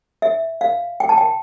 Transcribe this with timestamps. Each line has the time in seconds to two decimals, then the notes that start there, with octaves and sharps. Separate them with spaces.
0.22 E5
0.61 F5
1.00 G5
1.09 A5
1.18 G5